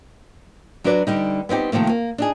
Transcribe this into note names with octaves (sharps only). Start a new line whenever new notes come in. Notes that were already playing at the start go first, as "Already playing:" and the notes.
F#3 D4 F#4 B4 D5
D3 G3 D#4
B3 C4 D#4 G4
C3 D#3 F3 A3 A#3
A#3
D4 D#4 G#4